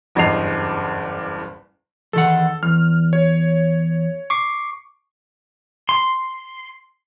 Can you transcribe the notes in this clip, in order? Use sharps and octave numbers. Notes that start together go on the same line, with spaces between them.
F#1 E2 G2 D#5 C7 F7
E2 D#3 A4 F#5
E2 F6
C#5
C#6 D6 C7
C6